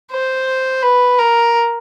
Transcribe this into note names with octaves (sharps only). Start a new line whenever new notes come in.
C5
B4
A#4